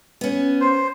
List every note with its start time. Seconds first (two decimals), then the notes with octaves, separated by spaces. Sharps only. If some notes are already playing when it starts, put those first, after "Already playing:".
0.21 B3 C#4
0.60 C5